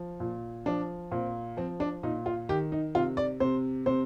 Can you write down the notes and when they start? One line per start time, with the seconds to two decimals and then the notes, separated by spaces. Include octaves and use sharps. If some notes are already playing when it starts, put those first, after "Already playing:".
Already playing: F3
0.20 A#2
0.66 F3 D4
1.12 A#2 C4
1.57 F3 C4
1.80 D4
2.03 A#2 D#4
2.26 F4
2.49 D#3 G4
2.72 D#4
2.95 C3 F4
3.17 D5
3.40 C3 C5
3.86 C3 C5